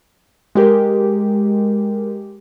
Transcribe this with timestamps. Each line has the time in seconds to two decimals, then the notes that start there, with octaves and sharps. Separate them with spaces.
0.55 G#3 G4 A#4